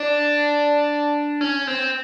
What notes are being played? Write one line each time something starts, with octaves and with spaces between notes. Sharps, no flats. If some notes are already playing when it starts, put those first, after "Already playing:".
Already playing: D4
C#4
C4